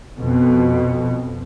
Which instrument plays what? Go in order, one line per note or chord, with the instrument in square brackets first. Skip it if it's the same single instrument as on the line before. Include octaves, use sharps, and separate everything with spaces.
[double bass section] F2 B2